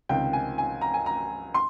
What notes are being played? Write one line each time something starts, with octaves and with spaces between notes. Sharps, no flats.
C#2 C3 D#3 G5
G#5
G#5
A#5
G#5
A#5
C6